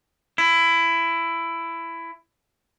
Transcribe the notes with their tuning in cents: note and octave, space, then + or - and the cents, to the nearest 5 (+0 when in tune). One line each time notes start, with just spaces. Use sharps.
E4 +15